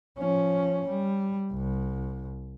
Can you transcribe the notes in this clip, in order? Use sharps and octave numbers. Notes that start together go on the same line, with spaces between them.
F3 C#4
G3
C2